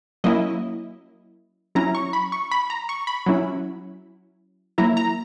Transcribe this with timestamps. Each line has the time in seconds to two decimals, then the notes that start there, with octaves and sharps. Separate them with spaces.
0.24 F#3 A#3 C#4 E4 D#5
1.75 F#3 C#4 E4 A#5
1.95 C#6
2.13 B5
2.32 C#6
2.51 B5
2.70 A#5
2.89 C#6
3.07 B5
3.26 F#3 C#4 E4
4.78 F#3 A#3 E4 A#5
4.97 A#5